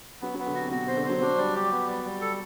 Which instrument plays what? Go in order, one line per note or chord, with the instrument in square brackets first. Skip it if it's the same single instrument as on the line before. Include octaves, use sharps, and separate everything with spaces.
[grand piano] F#3 [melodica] B3
[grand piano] F#3
[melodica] B3
[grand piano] D3
[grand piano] C3 [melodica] F#4
[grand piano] B2 [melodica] F#4
[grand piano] C3
[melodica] C5
[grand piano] D3
[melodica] C5
[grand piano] F#3
[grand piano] F#3 [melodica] D4
[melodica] G3
G4
B3
G3
G3
A4